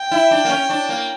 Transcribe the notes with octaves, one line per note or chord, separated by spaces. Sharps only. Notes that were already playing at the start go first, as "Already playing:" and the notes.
Already playing: G5
E4
D4
A#3
C#4
D4
A#3